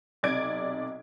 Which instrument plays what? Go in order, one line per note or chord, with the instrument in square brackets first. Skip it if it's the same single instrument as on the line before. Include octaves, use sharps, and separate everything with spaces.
[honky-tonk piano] B1 C3 D5 G#6 D7